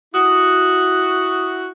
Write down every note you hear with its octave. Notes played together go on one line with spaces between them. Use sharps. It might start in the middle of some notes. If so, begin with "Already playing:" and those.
E4 F#4 D#6